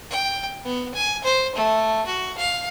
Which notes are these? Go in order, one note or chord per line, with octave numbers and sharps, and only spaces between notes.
G5
B3
G#5
C5
A3
F#4
F5